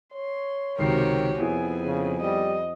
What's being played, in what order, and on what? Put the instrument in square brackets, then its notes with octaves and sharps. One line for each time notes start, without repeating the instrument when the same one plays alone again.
[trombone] C#5 [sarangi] C6
[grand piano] C#2 D#3 C7 [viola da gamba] C3 F#4 G4 [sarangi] A#4
[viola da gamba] F2 [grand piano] B3 E4 G#4 [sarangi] G#5
[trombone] C#3
[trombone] G3 [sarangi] D#5